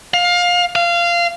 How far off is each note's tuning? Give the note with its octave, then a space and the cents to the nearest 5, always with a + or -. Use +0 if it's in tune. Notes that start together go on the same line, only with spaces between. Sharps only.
F5 +20
F5 -20